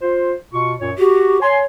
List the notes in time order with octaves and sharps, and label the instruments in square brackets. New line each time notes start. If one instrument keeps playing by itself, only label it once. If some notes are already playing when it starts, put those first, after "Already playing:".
[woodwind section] F4 C5
B2 F4 C#6
F#2 A#2 C#5
[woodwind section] F#4 [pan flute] G4
[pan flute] C#5 [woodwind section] G#5 C6